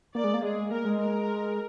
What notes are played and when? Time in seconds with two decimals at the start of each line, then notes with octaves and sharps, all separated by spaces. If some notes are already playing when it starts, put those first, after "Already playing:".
0.14 A#3 D5
0.24 G#3
0.34 A#3
0.43 G#3 G#4
0.72 A#3 A#4
0.85 G#3
1.00 A#4